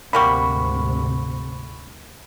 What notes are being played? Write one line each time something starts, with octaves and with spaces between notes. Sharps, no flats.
D2 G#2 C3 G3 A#3 F#4 B5 C#6